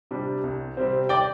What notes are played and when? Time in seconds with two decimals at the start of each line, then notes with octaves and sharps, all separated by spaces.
0.11 C3 G3 D4
0.44 C2
0.77 C3 G3 C4
1.09 D5 G5